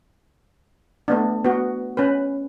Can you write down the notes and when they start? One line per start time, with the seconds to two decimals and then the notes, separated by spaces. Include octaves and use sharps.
1.08 A3 B3 D4
1.45 B3 F#4
1.97 C#4 B4